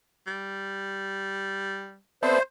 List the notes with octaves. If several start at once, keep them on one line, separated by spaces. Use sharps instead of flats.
G3
B3 C4 A4 C5 D5 E5